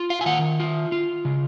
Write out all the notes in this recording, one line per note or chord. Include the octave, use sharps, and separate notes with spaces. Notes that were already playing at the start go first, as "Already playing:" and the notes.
Already playing: F4
F5
G#5
D#3 F#5
F4
F4
C#3